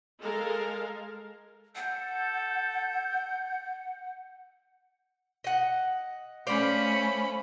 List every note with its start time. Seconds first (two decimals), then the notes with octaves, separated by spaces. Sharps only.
0.19 G#3 A4 A#4 F5
1.76 A4 F#5 G6
5.44 D#5 F#5
6.47 A3 C#4 C5 D5 F5 B5